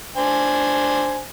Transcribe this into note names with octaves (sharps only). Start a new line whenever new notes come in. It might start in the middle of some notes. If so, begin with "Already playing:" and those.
D4 C5 G#5